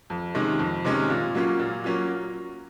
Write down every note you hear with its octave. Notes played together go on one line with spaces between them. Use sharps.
F2
C3 D#3 G#3 C#4
F2
C3 D#3 G#3 C#4
A#2
F#3 A#3 C#4 F4
A#2
F#3 A#3 C#4 F4